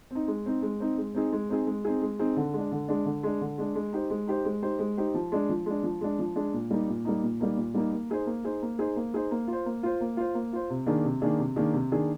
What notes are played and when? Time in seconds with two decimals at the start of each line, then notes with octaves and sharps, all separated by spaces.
0.11 C4 D#4
0.28 G#3
0.46 C4 D#4
0.62 G#3
0.80 C4 D#4
0.98 G#3
1.15 C4 D#4 G#4
1.33 G#3
1.50 C4 D#4 G#4
1.67 G#3
1.85 C4 D#4 G#4
2.02 G#3
2.19 C4 D#4 G#4
2.37 D3
2.54 G#3 D4
2.72 D3
2.89 G#3 D4
3.06 D3
3.23 G#3 D4
3.41 D3
3.58 G#3 D4
3.75 G#3
3.93 D#4 G4 C5
4.10 G#3
4.27 D#4 G4 C5
4.45 G#3
4.63 D#4 G4 C5
4.79 G#3
4.97 D#4 G4 C5
5.14 F3
5.32 G#3 D4
5.49 F3
5.66 G#3 D4
5.83 F3
6.01 G#3 D4
6.19 F3
6.36 G#3 D4
6.53 A#2
6.71 G3 A#3 D#4
6.88 A#2
7.05 G3 A#3 D#4
7.23 A#2
7.40 G3 A#3 D#4
7.57 A#2
7.74 G3 A#3 D#4
7.92 A#3
8.10 D#4 G#4 C5
8.26 A#3
8.44 D#4 G#4 C5
8.62 A#3
8.79 D#4 G#4 C5
8.96 A#3
9.14 D#4 G#4 C5
9.31 A#3
9.48 F4
9.53 C5
9.66 A#3
9.83 F4 C5
10.01 A#3
10.17 F4 C5
10.35 A#3
10.53 F4 C5
10.70 C3
10.86 D#3 A#3 D4 G#4
11.05 C3
11.22 D#3 A#3 D4 G#4
11.39 C3
11.56 D#3 A#3 D4 G#4
11.74 C3
11.92 D#3 A#3 D4 G#4